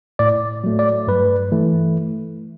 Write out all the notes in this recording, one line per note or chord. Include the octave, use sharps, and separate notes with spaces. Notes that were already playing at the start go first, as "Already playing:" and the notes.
A2 D5
F#3 A3
D5
G2 B4
E3 A3